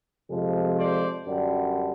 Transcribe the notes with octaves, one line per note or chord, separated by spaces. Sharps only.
F2 C3 F3 G#3
C5 D5
F#2 D3 G3